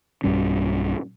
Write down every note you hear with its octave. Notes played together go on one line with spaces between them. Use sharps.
B1 G2 G3 C#4